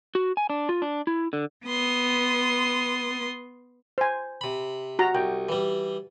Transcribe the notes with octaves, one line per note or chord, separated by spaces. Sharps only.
F#4
G#5
D4
F4
D4
E4
D3
B3 C6 D#6
C5 G#5
C3 B5
F#4 A#5
C2 G5
E3 G3